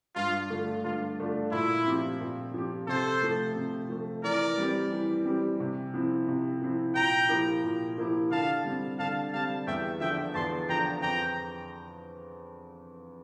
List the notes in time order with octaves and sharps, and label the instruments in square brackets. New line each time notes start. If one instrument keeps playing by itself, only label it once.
[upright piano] G2 [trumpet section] F4
[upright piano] D3 A3 D4 F4
[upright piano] G2 [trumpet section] F4
[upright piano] D3 A3 D4 F4
[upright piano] A#2 [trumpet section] E4
[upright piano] F3 C4 G4
A#2
F3 C4 G4
[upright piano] C3 [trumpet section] A4 C5
[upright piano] F3 A3
C3
F3 A3
[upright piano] E3 [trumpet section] A#4 D5
[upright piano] G3 C4 G4
E3
G3 C4 G4
C3
F3 C4 E4
C3
F3 C4 E4
[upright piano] A#2 [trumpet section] G5 A#5
[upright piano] F3 A#3 E4 G4
A#2
F3 A#3 E4 G4
[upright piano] D3 [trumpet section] F5 A5
[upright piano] G3 C4
[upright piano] D3 [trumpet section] F5 A5
[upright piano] G3 C4 [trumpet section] F5 A5
[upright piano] E2 [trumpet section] E5 G5
[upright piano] D3 F3 [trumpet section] E5 G5
[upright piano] E2 [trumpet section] A5 C6
[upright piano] D3 F3 [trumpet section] G5 A#5
[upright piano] F2 [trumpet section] G5 A#5